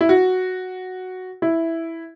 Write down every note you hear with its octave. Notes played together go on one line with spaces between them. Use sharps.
E4
F#4
E4